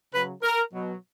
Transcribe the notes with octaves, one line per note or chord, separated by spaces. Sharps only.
C#3 F#3 B4
A#4
B2 F#3